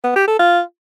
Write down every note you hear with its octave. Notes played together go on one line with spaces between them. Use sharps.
B3
G4
A4
F4